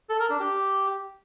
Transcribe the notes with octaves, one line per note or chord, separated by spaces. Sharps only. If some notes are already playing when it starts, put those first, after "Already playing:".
A4
A#4
D4
G4